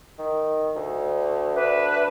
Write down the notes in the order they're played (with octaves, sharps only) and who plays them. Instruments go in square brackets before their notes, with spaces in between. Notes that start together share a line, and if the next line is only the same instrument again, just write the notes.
[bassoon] D#3
D2
[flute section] D4 B4 E5